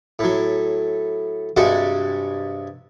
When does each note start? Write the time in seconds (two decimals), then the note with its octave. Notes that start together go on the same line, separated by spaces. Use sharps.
0.19 A2 F#3
1.57 G2 C3 G#3 F#4 F#5